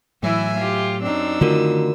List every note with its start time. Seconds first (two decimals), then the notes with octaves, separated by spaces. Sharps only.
0.23 A2 E3 F#3 E4 E5 G#5
0.57 F4 G4
1.02 F#2 C4 D4 D#4 E6
1.41 D3 D#3 A3 F4 F#4 A#4